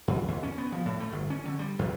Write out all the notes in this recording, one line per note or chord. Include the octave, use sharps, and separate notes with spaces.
F2
D#2
C#4
B3
F3
A2
A3
G1
C#4
D3
G3
E2